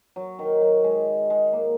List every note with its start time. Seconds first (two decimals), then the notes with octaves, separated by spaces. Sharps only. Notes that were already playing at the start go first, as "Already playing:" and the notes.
0.16 F#3
0.39 D#3
0.61 F#3
0.84 G#3
1.30 G#3
1.53 A#3